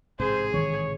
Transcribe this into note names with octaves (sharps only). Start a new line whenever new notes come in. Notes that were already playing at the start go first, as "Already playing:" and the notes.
A1 G#2 C3 G#4 C5
D#3 E3 C#5